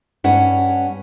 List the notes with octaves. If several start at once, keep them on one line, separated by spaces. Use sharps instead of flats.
G2 C#4 F#5